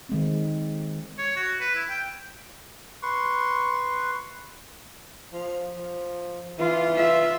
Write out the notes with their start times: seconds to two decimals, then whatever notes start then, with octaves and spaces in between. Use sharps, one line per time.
0.09 D#3 G#3 C4
1.18 C#5
1.36 F#4
1.60 B4
1.75 E4
1.90 G5
3.03 B4 C6 C#6
5.33 F3
5.77 F3
6.59 E3 F4
6.96 F4 E5